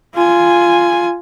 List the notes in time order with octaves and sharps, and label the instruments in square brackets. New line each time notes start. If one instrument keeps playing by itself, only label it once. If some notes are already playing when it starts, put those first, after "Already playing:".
[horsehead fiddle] F4 G#5